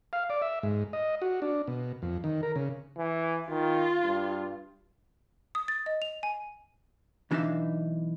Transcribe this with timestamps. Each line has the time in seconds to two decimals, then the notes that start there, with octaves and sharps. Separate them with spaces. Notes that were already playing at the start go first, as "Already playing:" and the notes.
0.13 F5
0.30 D5
0.42 E5
0.63 G#2
0.93 D#5
1.22 F#4
1.42 D4
1.68 B2
2.02 F2
2.24 D#3
2.43 A#4
2.56 C#3
2.97 E3
3.49 D#3 F4
4.04 G2
5.55 D#6
5.68 A6
5.86 D#5
6.02 F7
6.23 G#5
7.31 B1 E3 D4 D#4 E5 F5